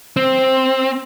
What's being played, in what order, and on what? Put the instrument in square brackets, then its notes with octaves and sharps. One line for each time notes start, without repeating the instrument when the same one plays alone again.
[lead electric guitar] C4